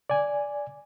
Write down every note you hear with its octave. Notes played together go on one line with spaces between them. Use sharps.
D5 G#5